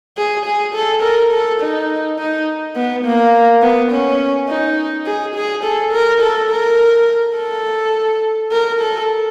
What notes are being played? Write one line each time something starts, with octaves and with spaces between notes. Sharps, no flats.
G#4
G#4
A4
A#4
A4
D#4
D#4
B3
A#3
B3
C#4
D#4
G#4
G#4
A4
A#4
A4
A#4
A4
A#4
A4